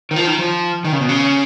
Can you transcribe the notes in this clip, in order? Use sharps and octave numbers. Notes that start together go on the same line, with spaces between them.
D#3
F3
D#3
F3
D#3
C#3
B2
C#3